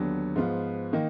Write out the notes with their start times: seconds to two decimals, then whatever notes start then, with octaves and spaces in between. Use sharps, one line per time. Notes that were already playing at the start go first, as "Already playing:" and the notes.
Already playing: D#2 D3 F#3 B3 D4
0.36 G#2 F3 B3 F4
0.93 D#3 A#3 D#4